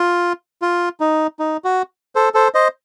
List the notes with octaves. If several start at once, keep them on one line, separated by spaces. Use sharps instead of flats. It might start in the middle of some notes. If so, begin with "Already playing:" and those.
Already playing: F4
F4
D#4
D#4
F#4
A4 C5
A4 C5
C5 D#5